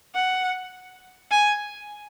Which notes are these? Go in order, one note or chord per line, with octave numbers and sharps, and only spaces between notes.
F#5
G#5